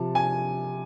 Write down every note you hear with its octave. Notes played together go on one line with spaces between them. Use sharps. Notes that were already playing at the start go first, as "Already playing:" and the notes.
Already playing: C3 F3 A5
G#5